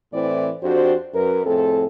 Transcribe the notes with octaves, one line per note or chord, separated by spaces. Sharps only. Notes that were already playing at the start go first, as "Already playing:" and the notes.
A2 E3 C4 E4 C5 D5
F2 D4 F#4 G4 C5
F#2 A#4 B4
F2 A2 C4 G#4 A4